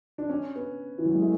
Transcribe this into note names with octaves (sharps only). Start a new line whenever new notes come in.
D4
C#4
B3
E3
F#3
G#3
A3